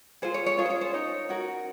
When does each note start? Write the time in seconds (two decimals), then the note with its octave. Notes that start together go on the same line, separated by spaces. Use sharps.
0.22 F4 G#4 C5
0.34 C#5
0.46 C#5
0.57 C#4 F4 G#4 C#5
0.66 C5
0.70 C#5
0.81 C5
0.93 D#4 A#4 C#5
1.29 C#4 F#4 A#4